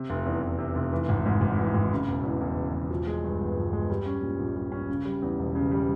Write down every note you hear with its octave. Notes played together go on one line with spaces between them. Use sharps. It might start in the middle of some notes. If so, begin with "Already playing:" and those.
Already playing: C3
F1
E2
F1
C3
F1
E3
G#1
G#2
G#1
E3
G#1
C#3
E1
E2
E1
C#3
E1
F3
G#3
G2
G1
F3
G#3
G3
C#4
A#2
A#1
G3
C#4
C#3
G3
E2
E1
C#3
G3